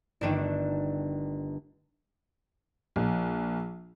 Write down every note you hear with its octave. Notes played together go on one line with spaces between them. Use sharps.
G1 D3 D#3 A3 D4 D#7
A#1